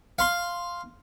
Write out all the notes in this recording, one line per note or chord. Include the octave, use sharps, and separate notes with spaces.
F5 C6